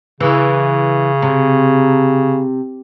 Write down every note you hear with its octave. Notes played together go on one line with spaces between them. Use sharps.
C#3 E3
C3